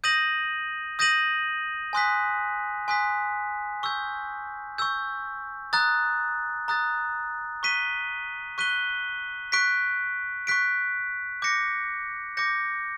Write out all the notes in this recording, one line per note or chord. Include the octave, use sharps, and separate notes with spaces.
D#6 G6 A#6 D#7 F#7
D#6 G6 A#6 D#7 F#7
G#5 C6 D#6 F#6 B6
G#5 C6 D#6 F#6 B6
C#6 E6 G6
C#6 E6 G6
A#5 D#6 F#6 A6
A#5 D#6 F#6 A6
C#6 F#6 B6 D#7 G7
C#6 F#6 B6 D#7 G7
C#6 F#6 B6 D7
C#6 F#6 B6 D7
D6 G6 A#6 C#7
D6 G6 A#6 C#7